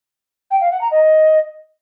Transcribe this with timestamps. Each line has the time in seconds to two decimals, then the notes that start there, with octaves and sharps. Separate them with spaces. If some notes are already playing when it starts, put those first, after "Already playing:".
0.51 G5
0.61 F5
0.71 F#5
0.81 A#5
0.91 D#5